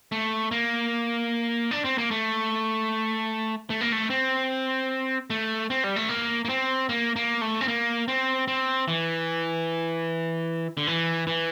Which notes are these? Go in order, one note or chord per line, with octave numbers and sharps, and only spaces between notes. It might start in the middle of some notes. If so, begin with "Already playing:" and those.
A3
A#3
D4
C4
A#3
A3
A3
A#3
A3
C4
A3
C4
G3
A3
A#3
A#3
C4
A#3
A#3
A3
C4
A#3
C4
C4
E3
D3
E3
E3